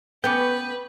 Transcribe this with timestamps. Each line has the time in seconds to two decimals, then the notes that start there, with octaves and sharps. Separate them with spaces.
0.24 B3 C#4 B4 G5 D6 G6